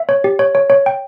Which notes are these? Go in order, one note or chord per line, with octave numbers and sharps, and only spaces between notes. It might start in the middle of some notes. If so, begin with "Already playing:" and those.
Already playing: E5
C#5
G4
C#5
C#5
C#5
G5